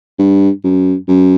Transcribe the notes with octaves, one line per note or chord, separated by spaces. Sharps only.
G2
F#2
F#2